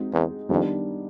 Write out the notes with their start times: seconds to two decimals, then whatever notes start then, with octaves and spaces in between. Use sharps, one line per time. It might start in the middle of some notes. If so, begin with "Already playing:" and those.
Already playing: G#3 C4 D#4 F#4
0.13 E2
0.49 F2 D#3 G3 B3 D4